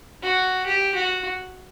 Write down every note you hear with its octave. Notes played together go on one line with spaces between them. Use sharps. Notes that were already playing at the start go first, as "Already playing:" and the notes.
F#4
G4
F#4